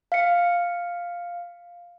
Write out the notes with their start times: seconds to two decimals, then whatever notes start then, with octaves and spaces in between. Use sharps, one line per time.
0.12 F5 C#7